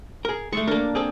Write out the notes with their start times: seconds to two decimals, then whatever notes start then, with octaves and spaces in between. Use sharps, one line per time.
0.25 G#4 A#4
0.53 G#3 A3 A4 C#6
0.68 A#3 D4 A4 A#4
0.95 C4 G#4 A4